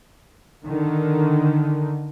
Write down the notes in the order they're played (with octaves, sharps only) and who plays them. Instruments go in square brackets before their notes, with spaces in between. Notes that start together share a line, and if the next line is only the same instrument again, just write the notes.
[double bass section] D3 D#3